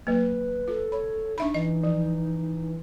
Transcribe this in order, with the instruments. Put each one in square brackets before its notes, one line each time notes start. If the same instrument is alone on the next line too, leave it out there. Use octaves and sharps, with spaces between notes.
[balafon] F#3 A#3 [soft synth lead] B4
[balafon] F4 [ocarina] A4
[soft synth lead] C#5 [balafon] B5
[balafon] D4 E5 B5 [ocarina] D#4
[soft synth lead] E3 [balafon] D#5
[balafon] F3